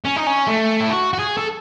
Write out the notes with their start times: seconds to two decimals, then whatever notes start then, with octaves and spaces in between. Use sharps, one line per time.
0.05 C#4
0.16 D#4
0.27 C#4
0.47 A3
0.80 E4
0.90 F#4
1.13 F#4
1.19 G#4
1.37 A4